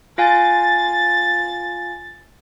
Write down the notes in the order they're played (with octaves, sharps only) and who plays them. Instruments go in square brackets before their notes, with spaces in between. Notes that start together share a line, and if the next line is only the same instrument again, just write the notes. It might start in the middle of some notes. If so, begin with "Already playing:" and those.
[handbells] F4 F5 G#5 [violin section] A6